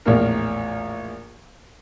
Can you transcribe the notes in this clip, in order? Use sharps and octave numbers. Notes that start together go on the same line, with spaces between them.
A#1 E2 A2 A#3 A#4